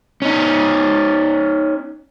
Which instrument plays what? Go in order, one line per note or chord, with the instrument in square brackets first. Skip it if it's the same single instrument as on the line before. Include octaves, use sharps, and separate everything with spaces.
[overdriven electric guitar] C#4 D#4